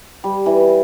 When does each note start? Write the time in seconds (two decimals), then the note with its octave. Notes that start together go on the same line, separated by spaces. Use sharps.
0.24 G3
0.46 E3